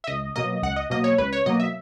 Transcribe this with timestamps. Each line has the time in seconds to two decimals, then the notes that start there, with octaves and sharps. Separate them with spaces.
0.04 E5
0.07 C#2 D#5
0.36 B2 F#3 A#3 D#5
0.63 C#2 F#5
0.76 D#5
0.90 B2 F#3 A#3 D#5
1.04 C#5
1.18 C#2 B4
1.33 C#5
1.46 B2 F#3 A#3 D#5
1.60 E5